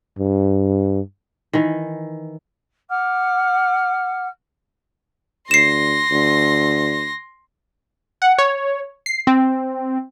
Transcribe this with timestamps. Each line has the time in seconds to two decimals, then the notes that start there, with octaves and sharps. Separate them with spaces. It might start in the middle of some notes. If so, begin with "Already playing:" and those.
0.19 G2
1.53 D#3 E3
2.89 F#5 D6 F6
5.51 D2 C6 A#6 C7 E7
6.11 D2
8.22 F#5
8.38 C#5
9.06 C7
9.27 C4